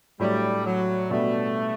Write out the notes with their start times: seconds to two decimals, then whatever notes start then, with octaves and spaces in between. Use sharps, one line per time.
0.20 A2 F#3 G3 A3 D4
0.65 F#3
1.10 B2 G3 A3 B3 D4 F#4